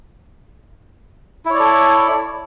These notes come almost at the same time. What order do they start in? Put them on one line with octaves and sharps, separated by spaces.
E4 C#5 D5 A4